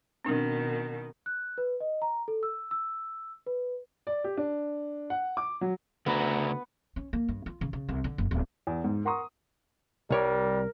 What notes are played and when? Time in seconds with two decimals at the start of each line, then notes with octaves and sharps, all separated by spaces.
0.25 B2 D#3 C4 D4
1.26 F#6
1.58 B4
1.80 D#5
2.02 A#5
2.28 A4
2.43 E6
2.71 E6
3.47 B4
4.07 D5
4.24 G4
4.37 D4
5.10 F#5
5.37 D6
5.61 F#3
6.06 D2 C#3 A3 B3 A#5
6.96 C#4
7.13 A#3
7.28 G2
7.46 F4
7.61 C#3
7.73 C#3
7.89 C2
8.04 D3
8.18 F#1
8.31 D1
8.67 E2
8.84 G#2
9.05 A#4 F#5 A#5 C6 C#6 D#6
10.10 C2 G3 A#4 C#5 D5